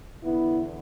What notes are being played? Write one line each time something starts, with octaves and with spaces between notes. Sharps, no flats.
E2 D3 B3 E4